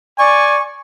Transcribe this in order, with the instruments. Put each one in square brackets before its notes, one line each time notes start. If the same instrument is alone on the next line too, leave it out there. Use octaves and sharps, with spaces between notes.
[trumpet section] D5 G#5 [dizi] C#6